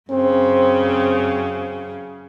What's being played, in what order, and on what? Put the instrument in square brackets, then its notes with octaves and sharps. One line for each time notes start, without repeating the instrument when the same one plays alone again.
[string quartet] F#2 C#3 [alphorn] C4